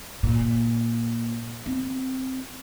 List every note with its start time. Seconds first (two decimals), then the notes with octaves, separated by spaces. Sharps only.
0.23 A#2
1.66 C4